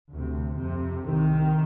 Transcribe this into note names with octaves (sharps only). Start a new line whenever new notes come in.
D2 C3
F2 C3
C2 C3 D#3